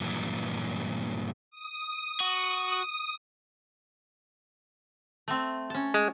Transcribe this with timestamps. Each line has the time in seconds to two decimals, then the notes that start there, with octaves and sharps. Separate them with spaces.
0.01 G2 A#2 E3 F#3
1.51 D#6
2.20 F#4
5.28 A3 C4
5.70 C#4 A5
5.94 G#3